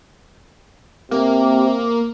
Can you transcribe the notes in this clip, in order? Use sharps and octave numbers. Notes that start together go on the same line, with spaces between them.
C3 A#3